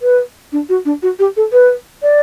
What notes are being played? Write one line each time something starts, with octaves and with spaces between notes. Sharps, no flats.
B4
D4
F#4
D4
F#4
G4
A4
B4
D5